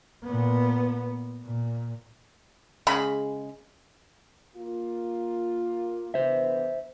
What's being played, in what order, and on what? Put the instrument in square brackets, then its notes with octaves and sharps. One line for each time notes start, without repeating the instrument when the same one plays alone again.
[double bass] A#2 B3
A#2
[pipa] C#3 G#3 B5
[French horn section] A#3 F4
[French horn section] D3 E3 B3 [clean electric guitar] C5 E5